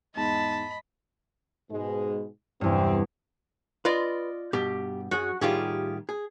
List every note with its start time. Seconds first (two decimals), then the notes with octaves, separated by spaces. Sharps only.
0.15 E2 G#2 D#5 A5 B5
1.70 G#2 B2 G#3
2.61 E2 G2 C3 E3 C4
3.85 F4 B4 D5 D#5
4.53 G2 B2 G4
5.11 F#2 F#4 G#4
5.41 A2 D#3 G3 F4 G4 G#4
6.09 G#4